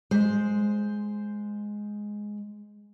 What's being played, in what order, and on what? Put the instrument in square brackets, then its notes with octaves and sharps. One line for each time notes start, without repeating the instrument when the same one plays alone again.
[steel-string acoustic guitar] G#3 C5